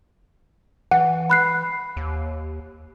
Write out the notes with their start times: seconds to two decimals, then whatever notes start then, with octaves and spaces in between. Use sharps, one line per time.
0.91 E3 F#5
1.30 B5 F#6 C7
1.97 D#2